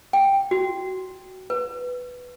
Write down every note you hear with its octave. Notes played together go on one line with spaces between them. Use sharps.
G5
F#4
B4